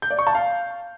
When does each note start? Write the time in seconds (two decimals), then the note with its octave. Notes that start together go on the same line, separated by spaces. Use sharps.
0.02 G6
0.10 D5
0.19 C#6
0.27 A5
0.35 F5